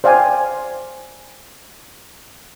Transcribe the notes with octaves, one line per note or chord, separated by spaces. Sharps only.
C5 D5 F5 G5 G#5